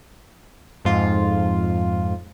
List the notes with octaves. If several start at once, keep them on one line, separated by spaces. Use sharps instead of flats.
F2 G#2 F4